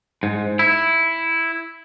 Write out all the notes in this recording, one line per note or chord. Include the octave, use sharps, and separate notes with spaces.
G#2
E4